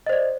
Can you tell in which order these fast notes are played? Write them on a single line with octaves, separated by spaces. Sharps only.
D#5 C5 D5